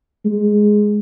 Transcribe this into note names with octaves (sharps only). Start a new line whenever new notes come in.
G#3